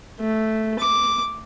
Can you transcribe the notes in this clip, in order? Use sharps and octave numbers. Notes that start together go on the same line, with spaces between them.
A3
D6